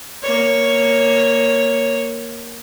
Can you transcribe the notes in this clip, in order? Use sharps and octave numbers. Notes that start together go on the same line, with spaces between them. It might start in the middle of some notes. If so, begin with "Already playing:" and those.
A#3 C#5